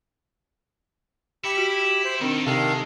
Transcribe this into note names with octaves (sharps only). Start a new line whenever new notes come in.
E4 G4 C#7
F#4 D7
C5
D#3 C4 D4 D#4 A4
C3 D#3 G#3 A4 F5